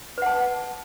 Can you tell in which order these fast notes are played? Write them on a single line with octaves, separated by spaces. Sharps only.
B4 F#5 A5